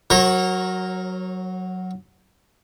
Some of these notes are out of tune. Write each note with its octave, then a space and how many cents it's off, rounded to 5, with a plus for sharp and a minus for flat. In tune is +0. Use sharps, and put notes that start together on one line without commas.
F#3 +0 A#4 +0 C#5 -35